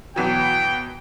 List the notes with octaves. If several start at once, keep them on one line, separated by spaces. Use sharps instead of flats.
B2 E3 F#3 G5